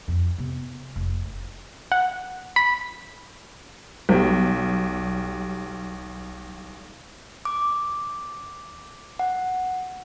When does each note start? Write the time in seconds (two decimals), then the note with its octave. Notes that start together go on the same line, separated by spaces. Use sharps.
0.08 F2
0.38 C3 B3
0.96 F1
1.92 F#5
2.56 B5
4.09 B1 G3
7.45 D6
9.19 F#5